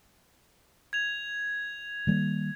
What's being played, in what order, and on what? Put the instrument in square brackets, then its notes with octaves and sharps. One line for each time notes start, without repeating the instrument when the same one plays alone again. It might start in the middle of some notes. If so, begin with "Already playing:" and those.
[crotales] G#6 F7
[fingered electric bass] D#3 G3 A#3